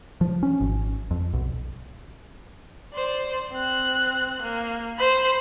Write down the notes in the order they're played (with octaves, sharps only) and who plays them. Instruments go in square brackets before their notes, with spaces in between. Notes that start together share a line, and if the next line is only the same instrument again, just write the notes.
[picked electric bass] F3
C#4
G#1
F2
B1
[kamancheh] C5 D5
C4 F#6
A#3
C5 B5